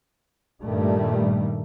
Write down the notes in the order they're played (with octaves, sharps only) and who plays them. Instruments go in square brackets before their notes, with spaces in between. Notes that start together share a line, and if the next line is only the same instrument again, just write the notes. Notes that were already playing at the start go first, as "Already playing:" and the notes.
[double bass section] G2 A#2 D#3 G3 A3